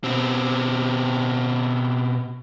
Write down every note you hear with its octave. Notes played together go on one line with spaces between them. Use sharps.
B2 C4